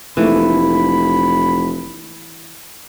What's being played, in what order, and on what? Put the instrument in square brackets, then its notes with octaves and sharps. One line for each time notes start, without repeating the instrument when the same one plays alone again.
[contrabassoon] F1 [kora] E3 A3 A#3 [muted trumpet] B5